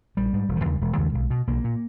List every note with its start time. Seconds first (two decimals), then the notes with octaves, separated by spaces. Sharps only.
0.17 A#1 G3
0.33 G#2
0.48 E1
0.56 D#3
0.65 D#2 C#3 E3
0.73 G3
0.81 E1 G#3
0.97 D#2 C#3
1.14 B1
1.30 B2
1.47 B1 A#3
1.64 A#2